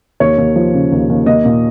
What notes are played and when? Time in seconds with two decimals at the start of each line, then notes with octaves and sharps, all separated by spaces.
0.20 D#2 C#5
0.38 D#2
0.56 F3
0.73 C#3
0.92 D#2
1.10 D#2
1.26 A#3 D#5
1.45 A#2